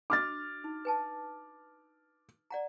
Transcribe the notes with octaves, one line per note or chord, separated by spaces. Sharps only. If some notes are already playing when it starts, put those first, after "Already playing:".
D4 F#4 D#5 D6 F6 A6
D#4
B4 G#5 A5
D5 F#5 A#5